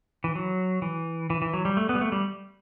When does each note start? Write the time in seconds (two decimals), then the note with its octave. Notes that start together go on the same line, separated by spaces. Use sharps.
0.24 E3
0.35 F#3
0.82 E3
1.30 E3
1.42 E3
1.54 F#3
1.65 G3
1.77 A3
1.89 B3
1.95 G3
2.01 A3
2.12 G3